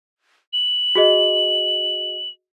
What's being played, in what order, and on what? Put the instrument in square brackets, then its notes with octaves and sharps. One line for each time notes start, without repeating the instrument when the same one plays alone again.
[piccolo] F#7
[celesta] F#4 G#4 D#5